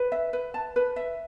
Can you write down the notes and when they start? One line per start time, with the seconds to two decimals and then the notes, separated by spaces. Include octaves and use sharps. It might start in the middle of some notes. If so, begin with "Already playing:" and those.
Already playing: B4
0.12 E5
0.33 B4
0.54 A5
0.76 B4
0.96 E5